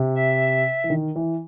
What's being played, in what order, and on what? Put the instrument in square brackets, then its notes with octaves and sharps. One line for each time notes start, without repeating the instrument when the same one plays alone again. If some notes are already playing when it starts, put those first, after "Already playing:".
Already playing: [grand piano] C3
[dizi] E5
[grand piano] E3
D#3
E3